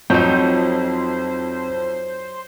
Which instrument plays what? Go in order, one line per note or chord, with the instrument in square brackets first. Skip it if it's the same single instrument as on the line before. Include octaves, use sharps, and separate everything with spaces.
[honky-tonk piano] F2 G6 [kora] F#3 D#4 [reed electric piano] C4 [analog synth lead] C5